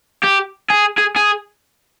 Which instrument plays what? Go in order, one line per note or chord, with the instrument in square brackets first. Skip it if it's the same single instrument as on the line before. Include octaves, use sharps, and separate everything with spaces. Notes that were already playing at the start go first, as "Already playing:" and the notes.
[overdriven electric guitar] G4
G#4
G#4
G#4